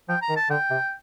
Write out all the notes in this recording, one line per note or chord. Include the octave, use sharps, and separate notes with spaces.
F3 G5
A#5
D#3
A5
D3 G5
C3